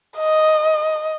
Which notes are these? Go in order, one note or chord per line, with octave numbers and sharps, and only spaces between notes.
D#5